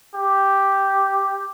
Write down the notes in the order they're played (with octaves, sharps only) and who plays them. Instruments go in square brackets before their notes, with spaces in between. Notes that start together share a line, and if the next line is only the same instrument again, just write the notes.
[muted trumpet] G4